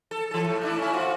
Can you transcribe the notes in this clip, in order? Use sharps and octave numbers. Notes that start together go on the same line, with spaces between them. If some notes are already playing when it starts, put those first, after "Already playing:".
A4
E3 A4
A2
A3 D4 E4
C#4 E4
C4 F4 F#4